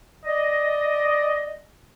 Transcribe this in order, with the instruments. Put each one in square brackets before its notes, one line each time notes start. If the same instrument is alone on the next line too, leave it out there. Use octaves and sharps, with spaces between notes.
[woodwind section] D5 D#5